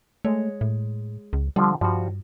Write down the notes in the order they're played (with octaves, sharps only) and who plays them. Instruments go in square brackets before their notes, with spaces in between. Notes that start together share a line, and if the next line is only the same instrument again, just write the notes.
[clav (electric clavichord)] G#3 C#5 [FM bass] A3
[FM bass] A2
C#2
[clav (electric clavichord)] D3 F3 [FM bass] G3
[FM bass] G2 [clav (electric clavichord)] F3 G3 F#4